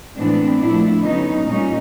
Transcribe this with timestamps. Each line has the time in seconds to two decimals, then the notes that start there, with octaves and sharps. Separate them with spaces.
0.16 A2 E3 G#3 B3 C4 D4
0.60 A#2 F3 A3 D4 E4
1.03 D3 F#3 B3 C#4 D#4
1.46 A#2 G3 A#3 C#4 D#4